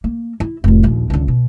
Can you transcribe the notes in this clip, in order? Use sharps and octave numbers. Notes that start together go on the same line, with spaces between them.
A#3
E4
F1 A2
A#1 D#2
C#2 D3
B2